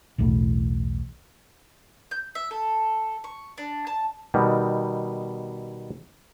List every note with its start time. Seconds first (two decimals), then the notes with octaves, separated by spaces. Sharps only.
0.18 B1 E2 A2
2.11 G6
2.35 E5
2.51 A4
3.24 C#6
3.58 D4
3.87 A5
4.34 B2 D#3 G3